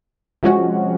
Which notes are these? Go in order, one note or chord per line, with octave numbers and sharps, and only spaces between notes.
C3 F3 G#3 C#4 F#4